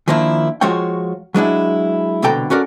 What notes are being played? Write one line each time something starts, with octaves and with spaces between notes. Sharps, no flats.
D#3 F3 A#3 D4 E4
F3 G#3 F4 F#4 C#5 G5
F#3 G#3 D4 E4
C2 B2 D3 A4 G5 A#5
C#4 F#4 A4 A#4 D5